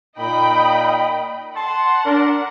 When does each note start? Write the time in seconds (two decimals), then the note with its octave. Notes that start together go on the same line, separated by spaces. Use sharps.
0.18 A#2 D#4 D#5 G5 B5
1.56 F#5 A5 C6
2.05 D4 A#4